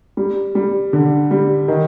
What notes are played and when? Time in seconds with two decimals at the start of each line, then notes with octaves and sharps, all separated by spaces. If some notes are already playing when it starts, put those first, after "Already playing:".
0.17 G3
0.55 G3
0.93 D3
1.31 G3
1.68 D#3